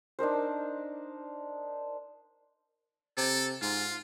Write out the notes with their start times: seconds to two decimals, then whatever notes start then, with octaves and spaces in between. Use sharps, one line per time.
0.19 D4 D#4 A#4 C5
3.17 C3 A4
3.62 G#2 F4